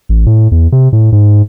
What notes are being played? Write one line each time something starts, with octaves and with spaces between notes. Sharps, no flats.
A1
A2
E2
C3
A2
G#2